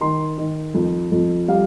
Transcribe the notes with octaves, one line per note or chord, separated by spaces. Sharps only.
D#3 C6
D#3
F2
F2
G3 F5